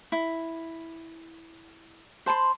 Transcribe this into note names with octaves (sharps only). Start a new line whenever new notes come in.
E4
C5 A5 B5 C6